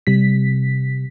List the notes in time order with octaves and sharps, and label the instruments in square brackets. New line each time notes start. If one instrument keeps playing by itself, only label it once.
[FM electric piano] C3 G3 B6